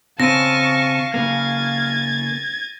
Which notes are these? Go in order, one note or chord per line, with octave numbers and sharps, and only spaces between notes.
C#3 C4 C#4 F5 A5 C#6 A#6 D#7
C#3 A#3 G#6 A6